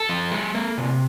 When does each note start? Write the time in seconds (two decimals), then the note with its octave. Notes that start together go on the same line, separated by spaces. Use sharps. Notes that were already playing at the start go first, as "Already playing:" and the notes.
Already playing: A4
0.09 F3
0.32 G#3
0.55 A#3
0.78 C3